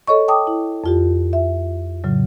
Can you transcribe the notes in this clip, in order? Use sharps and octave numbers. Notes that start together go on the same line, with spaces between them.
A4 C#5 D#5 C#6
G5 A5 D6 D#6
E4
F2 F4 G4
E5
A2 C#3 F#3